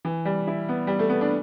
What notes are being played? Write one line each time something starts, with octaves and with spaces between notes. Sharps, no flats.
E3
G3
E4
B3
G3
A3
B3
D4